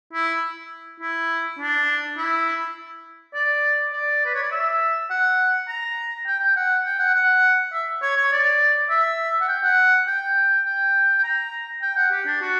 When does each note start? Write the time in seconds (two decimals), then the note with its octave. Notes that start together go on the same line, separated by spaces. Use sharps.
0.13 E4
1.00 E4
1.59 D4
2.17 E4
3.34 D5
3.93 D5
4.25 B4
4.34 C#5
4.43 D5
4.52 E5
5.10 F#5
5.69 A#5
6.27 G5
6.42 G5
6.56 F#5
6.85 G5
7.00 F#5
7.14 F#5
7.73 E5
8.02 C#5
8.17 C#5
8.32 D5
8.90 E5
9.41 F#5
9.48 G5
9.64 F#5
10.07 G5
10.65 G5
11.18 G5
11.24 A#5
11.82 G5
11.97 F#5
12.11 G4
12.27 D4
12.41 F#4